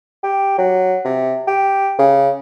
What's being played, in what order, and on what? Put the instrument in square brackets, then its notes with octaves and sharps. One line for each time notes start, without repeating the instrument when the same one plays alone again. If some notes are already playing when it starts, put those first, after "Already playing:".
[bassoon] G4
F#3
C3
G4
C#3